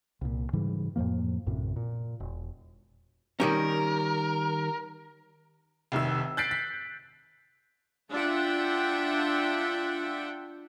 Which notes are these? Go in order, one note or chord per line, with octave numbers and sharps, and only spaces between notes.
C2 A#2
G#2 C#3 E3 G3
F2 A2 F3 A#3
A#1 F#2 A2 C3
A#2
E1
D#3 G3 C#4 A#4
F1 C2 D#3 E6
F#6 G6 A6 B6 C7 D7
B6
D4 F4 E5 F#5 G5